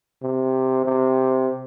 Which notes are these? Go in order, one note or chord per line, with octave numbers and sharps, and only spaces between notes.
C3
C3